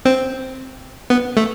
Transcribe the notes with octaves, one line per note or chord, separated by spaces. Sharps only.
C4
B3
A3